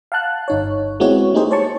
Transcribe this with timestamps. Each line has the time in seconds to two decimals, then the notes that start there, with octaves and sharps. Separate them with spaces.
0.12 F5 F#5 A5 F#6
0.48 G1 D#4 C#5
1.00 G#3 B3 C4 E4 F#4 C#5
1.34 A3 A#3 D#4 G4 G#4 C5
1.51 C5 C#5 A5 C#6